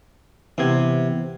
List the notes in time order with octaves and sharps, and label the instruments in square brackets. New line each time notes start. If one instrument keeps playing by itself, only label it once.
[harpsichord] C3 [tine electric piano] E3 B3 G#6